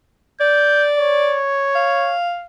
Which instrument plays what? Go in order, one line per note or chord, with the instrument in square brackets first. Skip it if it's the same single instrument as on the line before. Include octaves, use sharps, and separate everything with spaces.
[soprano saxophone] D5 [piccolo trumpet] G6
[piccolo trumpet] C#5
[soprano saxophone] F5